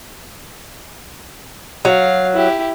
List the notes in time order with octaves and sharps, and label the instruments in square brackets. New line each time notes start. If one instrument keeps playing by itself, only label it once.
[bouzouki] F#3 [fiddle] F5
[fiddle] E4 G4